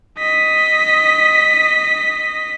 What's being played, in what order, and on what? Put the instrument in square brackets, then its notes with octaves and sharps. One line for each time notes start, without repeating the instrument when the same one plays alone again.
[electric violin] D#5 B6